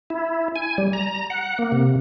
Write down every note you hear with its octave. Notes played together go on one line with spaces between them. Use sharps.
E4
G#5
G3
A#5
F#5
A#3
C3